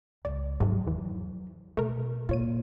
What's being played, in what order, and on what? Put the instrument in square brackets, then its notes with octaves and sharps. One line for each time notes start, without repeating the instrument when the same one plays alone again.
[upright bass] C#2 [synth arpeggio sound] D5
[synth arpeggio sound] G#2 C3 A3 [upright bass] F3 F#3
[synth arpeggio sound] E2 E3
[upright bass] B2 [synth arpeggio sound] A3 A#4
[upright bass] A#2 [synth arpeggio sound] F4 C#5 D#7